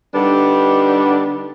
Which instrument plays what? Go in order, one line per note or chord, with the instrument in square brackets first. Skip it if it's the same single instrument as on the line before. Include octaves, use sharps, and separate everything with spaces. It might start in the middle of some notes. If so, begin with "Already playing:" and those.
[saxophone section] D3 G3 B3 D4 D#4